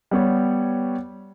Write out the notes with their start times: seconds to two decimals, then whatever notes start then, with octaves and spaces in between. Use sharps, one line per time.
0.11 G3 B3 C#5